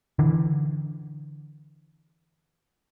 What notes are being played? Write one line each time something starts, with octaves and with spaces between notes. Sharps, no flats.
D3 E3